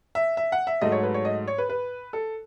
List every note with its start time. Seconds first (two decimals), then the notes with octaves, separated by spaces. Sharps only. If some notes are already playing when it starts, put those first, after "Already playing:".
0.15 E5
0.37 E5
0.52 F#5
0.67 E5
0.81 G#2 F#3 A3 D#5
0.92 C#5
1.03 B4
1.14 C#5
1.25 D#5
1.48 C#5
1.58 B4
1.69 B4
2.13 A4